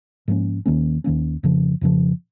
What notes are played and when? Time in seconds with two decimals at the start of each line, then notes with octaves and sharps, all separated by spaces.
0.28 G#2 F3 A#3 C#4
0.66 D#2 D#3 A#3 C#4
1.04 D#2 D#3 A#3 C#4
1.43 F2 C#3 F3
1.81 F2 C#3 F3